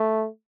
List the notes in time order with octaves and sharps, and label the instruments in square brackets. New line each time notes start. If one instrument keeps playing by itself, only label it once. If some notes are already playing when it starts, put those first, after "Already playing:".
Already playing: [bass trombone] A3